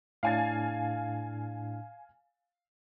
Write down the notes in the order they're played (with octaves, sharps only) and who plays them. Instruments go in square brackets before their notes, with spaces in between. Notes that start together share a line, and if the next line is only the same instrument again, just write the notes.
[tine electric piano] A2 D4 [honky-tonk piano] F5 G#5 A6